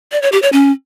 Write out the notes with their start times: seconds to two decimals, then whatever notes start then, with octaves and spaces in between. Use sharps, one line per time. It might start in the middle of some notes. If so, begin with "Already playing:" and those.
0.12 D5
0.22 C#5
0.32 G4
0.42 C#5
0.52 C#4